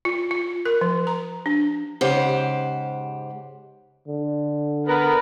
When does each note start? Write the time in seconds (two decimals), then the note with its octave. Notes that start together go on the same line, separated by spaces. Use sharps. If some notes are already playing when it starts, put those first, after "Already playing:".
0.05 F4
0.31 F4
0.65 A#4
0.81 F3
1.07 A#5
1.46 D4
2.01 G#2 C#3 G4 C5 F#5
4.08 D3
4.87 B3 A#4